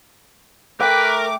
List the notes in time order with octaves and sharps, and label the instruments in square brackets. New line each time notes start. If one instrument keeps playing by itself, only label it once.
[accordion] A3 D6 [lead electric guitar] A#4 [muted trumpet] B4 [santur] G5